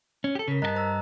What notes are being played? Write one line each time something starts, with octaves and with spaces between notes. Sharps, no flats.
C#4
G4 A4
C#3 A#4 B6
G2 G4 D#5 A5 A#5 F#6
C5 A#5 E6